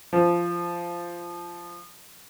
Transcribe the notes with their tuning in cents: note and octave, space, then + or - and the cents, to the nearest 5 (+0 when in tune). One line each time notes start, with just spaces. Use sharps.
F3 -15